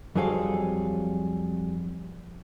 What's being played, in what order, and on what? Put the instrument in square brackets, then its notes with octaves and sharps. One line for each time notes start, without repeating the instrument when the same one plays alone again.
[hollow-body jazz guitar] F2 F#3 G3 G#4 A4 F5